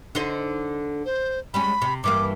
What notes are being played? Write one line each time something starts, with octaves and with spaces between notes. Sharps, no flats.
D3 D#4 C5
C5
G3 G#3 C#4 B5
C3
G2 E3 A#3 D6